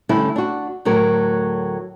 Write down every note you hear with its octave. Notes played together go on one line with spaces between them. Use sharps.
D3 G3 A3 C#4 E4
D4 F#4
D2 A2 F#3 A#4